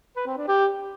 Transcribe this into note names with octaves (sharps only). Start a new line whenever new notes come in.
B4
C4
D4
G4